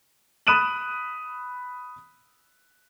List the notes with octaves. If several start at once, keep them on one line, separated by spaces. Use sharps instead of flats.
B5 D#6 F#6 D#7 E7 F#7